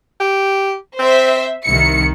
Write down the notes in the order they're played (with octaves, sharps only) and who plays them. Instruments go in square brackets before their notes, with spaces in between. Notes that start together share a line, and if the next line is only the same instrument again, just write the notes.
[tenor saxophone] G4
[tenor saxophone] C4 [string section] C5 E5
[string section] C2 D#3 C#7 [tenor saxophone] E4